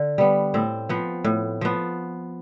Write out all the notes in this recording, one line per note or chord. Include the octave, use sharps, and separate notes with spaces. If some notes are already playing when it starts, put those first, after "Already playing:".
Already playing: D3
G3 B3
A2 C4
F3 B3
A2
F3 B3